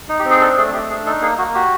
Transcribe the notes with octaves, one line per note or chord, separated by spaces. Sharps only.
D#4
G4
C4
G#4
D4 A4
A3 G#4
A3 G4
D4 G#4
D#4 A4
A#3 G#4
A#3 F#4
F#4 G4